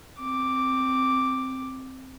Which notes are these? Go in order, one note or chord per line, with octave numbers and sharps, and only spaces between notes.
C4 D6